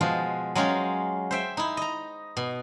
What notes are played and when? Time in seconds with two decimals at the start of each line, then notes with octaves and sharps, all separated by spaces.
0.01 B2 F3 G#3 F4 F#4
0.55 F#3 G#3 C#4 F4 G5 A#5
1.31 C5 E5 G5
1.57 D#4 E4
1.77 D#5 A#5
2.37 B2